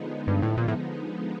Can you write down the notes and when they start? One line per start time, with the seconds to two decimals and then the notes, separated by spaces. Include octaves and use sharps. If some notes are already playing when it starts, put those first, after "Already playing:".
Already playing: D3 F3 G#3 B3 D#4
0.27 G2
0.42 A2
0.57 A#2
0.68 A2